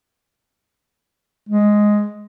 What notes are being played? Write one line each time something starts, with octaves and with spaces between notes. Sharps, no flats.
G#3